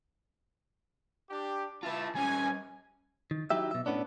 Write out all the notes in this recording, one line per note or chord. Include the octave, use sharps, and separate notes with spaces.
D4 G4
E4 F4 B4 E5 A5
G3 C#4 G#5
D#3
F#3 D#4 E4 G4 E5
B2 E5
A2 B3 C#4 D4